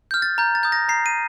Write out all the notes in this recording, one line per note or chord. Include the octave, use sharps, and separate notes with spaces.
F6 G6
A6
A#5 G6
A6
D#6 G6
A#6
A#5 C7
D#7